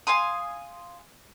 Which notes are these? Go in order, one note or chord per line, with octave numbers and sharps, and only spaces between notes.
F5 G#5 C6 D#6